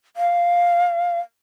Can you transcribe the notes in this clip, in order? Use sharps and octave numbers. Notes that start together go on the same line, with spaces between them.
F5